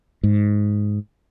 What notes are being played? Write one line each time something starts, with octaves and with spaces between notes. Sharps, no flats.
G#2